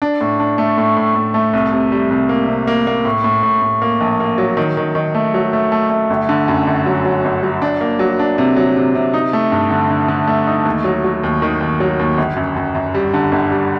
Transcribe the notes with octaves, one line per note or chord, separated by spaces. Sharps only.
D4
A2
D4
A3
A2
A2
A2
A3
C2
C3
G3
C2
A#3
C3
A#3
A#3
A2
A2
A2
A2
A#3
A#1
A#3
F#3
D#3
D#3
D#3
A3
F#3
A3
A3
A3
G1
D3
F#2
G1
F#3
F#3
G1
F#3
D4
A#3
F#3
D4
C3
F#3
C3
C3
D#4
A3
G2
D3
D3
D3
A3
D#4
D#2
F#3
F#3
D#2
D#3
D#2
F#3
D#2
G1
F#2
F#2
F#2
G3
D3
G1
G3